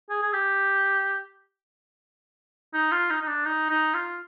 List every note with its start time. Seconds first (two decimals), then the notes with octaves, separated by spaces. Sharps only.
0.10 G#4
0.22 G#4
0.33 G4
2.74 D#4
2.92 F4
3.10 D#4
3.22 D#4
3.27 D4
3.45 D#4
3.70 D#4
3.94 F4